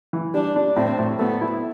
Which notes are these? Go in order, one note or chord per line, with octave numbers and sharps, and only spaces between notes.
E3
G3 D4
D4
A2 C4
A2
A3 B3
E4